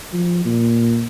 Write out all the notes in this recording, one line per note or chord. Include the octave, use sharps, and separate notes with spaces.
F3
A#2